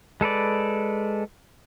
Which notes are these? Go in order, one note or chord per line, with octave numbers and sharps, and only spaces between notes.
G#3 A4 B4 D5